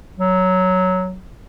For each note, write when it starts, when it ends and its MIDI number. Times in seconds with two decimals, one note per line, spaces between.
0.16 1.19 54